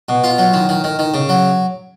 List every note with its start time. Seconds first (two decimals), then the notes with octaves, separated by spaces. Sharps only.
0.09 B2
0.24 F4
0.38 F#3
0.53 D#3
0.69 D#3
0.84 D#3
0.99 D#3
1.14 C#3
1.29 F#3